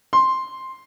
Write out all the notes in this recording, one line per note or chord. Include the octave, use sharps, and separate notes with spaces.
C6